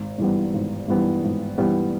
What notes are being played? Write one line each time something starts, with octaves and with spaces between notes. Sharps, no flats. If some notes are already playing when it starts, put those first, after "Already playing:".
Already playing: G#1
G2 E3 G3 B3
G#1
G2 E3 G3 B3
G#1
G2 E3 G3 B3